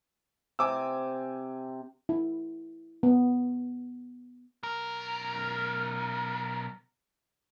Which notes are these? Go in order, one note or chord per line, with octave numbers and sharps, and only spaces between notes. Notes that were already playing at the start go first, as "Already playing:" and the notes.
C3 G#5 D6 E6
E4
B3
B1 A#4